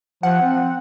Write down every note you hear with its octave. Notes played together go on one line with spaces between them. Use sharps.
F3 F#5
C4